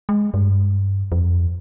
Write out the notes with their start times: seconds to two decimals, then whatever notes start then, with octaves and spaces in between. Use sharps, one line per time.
0.09 G#3
0.34 G2
1.12 F2